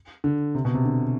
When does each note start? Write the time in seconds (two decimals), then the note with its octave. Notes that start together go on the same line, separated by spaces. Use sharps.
0.24 D3
0.55 C3
0.65 B2
0.74 C3
0.85 D3